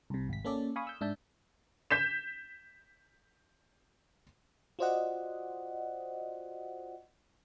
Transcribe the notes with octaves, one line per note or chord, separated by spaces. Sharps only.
C2 C3
G#1 B6
A#3 C#4 A4 D5
F5 G#5 B5 C#6 D#6
E6 G6
G#2 D4 E5 A5 G6
G6 B6 E7
F4 F#4 C5 D5 D#5 F#5